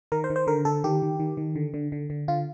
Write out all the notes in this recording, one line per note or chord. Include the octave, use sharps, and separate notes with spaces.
D#3 A#4
C5
D#3
C5
D3 A#4
D3 A4
D#3 G4
D#3
D#3
D#3
D3
D3
D3
D3
D3 F4